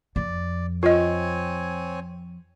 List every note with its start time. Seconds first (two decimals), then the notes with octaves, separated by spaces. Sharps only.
0.16 F2 D5
0.83 C4 F4 C#5 D#5 G#5